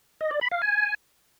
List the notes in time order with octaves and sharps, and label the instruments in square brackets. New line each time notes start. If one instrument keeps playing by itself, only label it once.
[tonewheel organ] D#5
D5
B5
F5
G#5